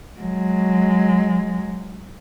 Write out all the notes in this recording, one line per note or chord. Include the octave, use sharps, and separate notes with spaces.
F#3 G#3